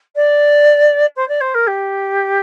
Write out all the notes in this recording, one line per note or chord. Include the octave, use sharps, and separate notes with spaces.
D5
C5
D5
C5
A#4
G4